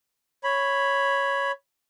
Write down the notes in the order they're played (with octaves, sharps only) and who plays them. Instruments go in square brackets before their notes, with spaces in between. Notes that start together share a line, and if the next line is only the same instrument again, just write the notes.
[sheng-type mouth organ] C#5 B5